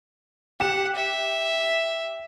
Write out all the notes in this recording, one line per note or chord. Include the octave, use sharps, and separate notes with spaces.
G4 F#5 E7
E5